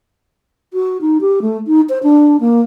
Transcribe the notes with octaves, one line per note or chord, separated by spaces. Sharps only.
F#4
D#4
G4
A3
D#4
C5
D4
A#3